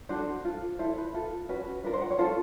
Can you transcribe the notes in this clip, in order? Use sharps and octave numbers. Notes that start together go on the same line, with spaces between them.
D4 F#4 A4 C5
F4 A4
E4 A4 C5
B4
F4 A4
C#4 F#4 B4
D4 F4 A#4 B4
C5
F#5
C#5
C#4 F4 A4 C5